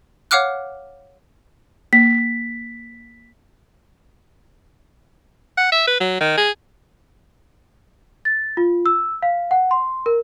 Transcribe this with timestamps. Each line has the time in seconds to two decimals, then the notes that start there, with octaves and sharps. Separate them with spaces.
0.31 C#5 F5 F#5 D6 F6 F#6
1.93 A#3 B6
5.58 F#5
5.72 E5
5.88 B4
6.01 F#3
6.21 D#3
6.37 G#4
8.25 A6
8.57 F4
8.86 E6
9.22 F5
9.51 F#5
9.71 C6
10.06 A#4